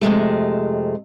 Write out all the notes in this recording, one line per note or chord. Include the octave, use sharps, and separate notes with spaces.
F2 C3 G#3 A3